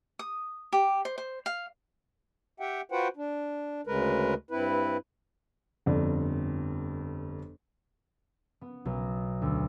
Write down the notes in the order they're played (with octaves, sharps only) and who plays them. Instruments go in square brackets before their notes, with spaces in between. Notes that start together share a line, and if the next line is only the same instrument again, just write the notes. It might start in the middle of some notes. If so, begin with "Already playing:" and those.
[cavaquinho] D#6
G4
C5
C5
F5
[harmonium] G4 E5 F#5 G5
F4 F#4 B4 C5 F#5 G5
D4
D2 C#3 G#3 A#4 B4
G2 C4 E4 B4
[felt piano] G1 F2 D5
[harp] B3
B1
D2